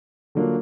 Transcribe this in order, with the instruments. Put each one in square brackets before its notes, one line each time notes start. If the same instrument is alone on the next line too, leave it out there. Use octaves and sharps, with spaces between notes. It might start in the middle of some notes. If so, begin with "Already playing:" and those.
[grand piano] D3 F#3 A#3 D4 F4